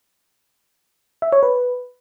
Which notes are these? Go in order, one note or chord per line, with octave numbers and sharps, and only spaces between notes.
E5
C#5
B4